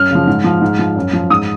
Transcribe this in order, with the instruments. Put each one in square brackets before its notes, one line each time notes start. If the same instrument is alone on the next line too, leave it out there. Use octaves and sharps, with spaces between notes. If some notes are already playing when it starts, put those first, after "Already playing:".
Already playing: [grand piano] F#2 F6
C#3 F3
G#2
F3
G#2
F3
F#2
F3
G#2 D#6